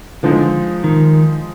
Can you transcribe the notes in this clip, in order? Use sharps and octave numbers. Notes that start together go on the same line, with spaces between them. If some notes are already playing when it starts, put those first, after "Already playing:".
D3 F3 G#3 D#4
D#3